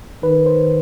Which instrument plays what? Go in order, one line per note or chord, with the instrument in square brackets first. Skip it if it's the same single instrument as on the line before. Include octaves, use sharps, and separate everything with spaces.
[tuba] D#3 [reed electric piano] B4
[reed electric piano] C5